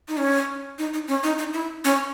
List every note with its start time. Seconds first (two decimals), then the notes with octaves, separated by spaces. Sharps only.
0.08 D#4
0.18 C#4
0.79 D#4
0.94 D#4
1.08 C#4
1.24 D#4
1.39 D#4
1.53 E4
1.85 C#4